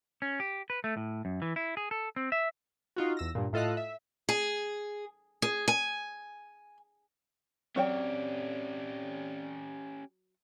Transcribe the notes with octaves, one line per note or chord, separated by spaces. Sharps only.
C#4
G4
B4
A3
A2
F#2
E3
E4
G#4
A4
C4
E5
D#4 F4 F#4
E2 E6 A#6
G2 A#2
A2 F4 A4 D#5 F5 F#6
E5
G#4
G#4
G#5
F#3 C4 C#4 G4 C#5 D5 G5